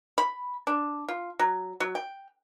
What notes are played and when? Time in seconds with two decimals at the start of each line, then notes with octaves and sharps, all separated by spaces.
0.18 B5
0.67 D4
1.08 F4
1.39 F#3
1.80 F#3
1.95 G5